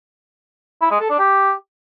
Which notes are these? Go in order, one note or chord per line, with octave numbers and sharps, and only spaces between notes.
E4
G#3
A4
D4
G4